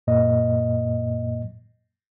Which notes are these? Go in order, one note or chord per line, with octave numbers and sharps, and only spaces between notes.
F#2 A#2 A#3 D#5